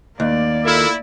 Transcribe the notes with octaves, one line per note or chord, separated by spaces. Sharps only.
D#2 A#3 D5
E4 F4 A4 A#4